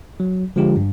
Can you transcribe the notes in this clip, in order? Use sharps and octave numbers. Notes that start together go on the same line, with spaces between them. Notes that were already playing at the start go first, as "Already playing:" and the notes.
F#3
D3 F3 G#3 F4 G4
G2